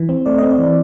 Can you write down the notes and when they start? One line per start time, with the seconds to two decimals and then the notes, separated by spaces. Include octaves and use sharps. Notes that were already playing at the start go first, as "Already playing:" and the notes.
Already playing: E3
0.09 C4
0.26 A3 D5
0.38 C4 D#5
0.50 D5
0.58 E3